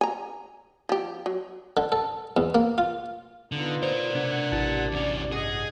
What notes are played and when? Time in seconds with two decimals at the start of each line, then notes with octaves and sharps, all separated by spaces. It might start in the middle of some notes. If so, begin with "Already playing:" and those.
0.01 G#5 A#5
0.89 F3 G4
1.26 F#3
1.77 D3
1.92 A4
2.37 E2
2.55 A#3
2.78 F4
3.52 D3 B3 D#4 F4
3.83 A#4 C5 D5
4.13 C3 D4 F#5 G#6
4.52 A1 A5
4.92 E2 C#4 D5
5.32 G1 G#4 D#5 F#5 C#7